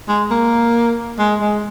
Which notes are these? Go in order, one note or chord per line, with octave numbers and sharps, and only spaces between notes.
G#3
A#3
G#3
G#3